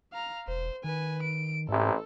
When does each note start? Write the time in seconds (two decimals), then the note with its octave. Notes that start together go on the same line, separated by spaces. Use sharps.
0.12 F5 A#5
0.47 E1 C5
0.84 D#3 B4 G#5
1.23 D7
1.69 A1 G#2 C3 A4